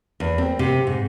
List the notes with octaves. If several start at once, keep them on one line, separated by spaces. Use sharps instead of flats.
E2
C4
C3
G#2